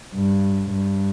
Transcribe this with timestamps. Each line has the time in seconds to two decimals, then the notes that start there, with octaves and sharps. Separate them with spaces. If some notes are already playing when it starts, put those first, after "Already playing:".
0.15 G2
0.70 G2